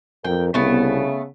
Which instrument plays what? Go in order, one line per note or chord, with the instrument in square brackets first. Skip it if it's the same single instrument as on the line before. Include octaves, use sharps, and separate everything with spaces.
[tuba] F2 [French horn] A#4 [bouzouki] G5
[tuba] C2 [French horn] C#3 [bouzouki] A3 B3